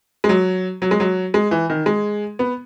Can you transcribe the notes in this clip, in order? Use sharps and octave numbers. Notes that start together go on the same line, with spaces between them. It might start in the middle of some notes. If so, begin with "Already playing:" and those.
G#3
F#3
F#3
G#3
F#3
G#3
E3
D#3
G#3
B3